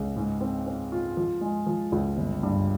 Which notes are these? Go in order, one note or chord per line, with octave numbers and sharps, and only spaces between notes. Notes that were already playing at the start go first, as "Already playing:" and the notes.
Already playing: C#2
G#2
C4
C4
F4
F3
G#3
F3
C#2
G1
G2